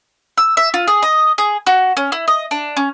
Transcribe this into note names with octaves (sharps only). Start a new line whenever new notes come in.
E6
E5
F4
G#4
D#5
G#4
F#4
C#4
E4
D#5
D4
C#4